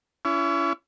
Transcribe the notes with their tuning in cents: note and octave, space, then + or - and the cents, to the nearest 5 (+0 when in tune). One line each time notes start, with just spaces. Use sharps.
C#4 +35 E4 +35